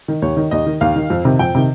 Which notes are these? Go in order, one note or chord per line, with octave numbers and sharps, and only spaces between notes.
D#3
D#2 C#5
D#3
D#2 D#5
D#3
D#2 F5
D#3
F2
C3 D#3
F2 G5
C3 D#3